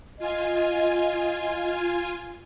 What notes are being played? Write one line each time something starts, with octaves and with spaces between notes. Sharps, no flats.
F4 D#5 G#5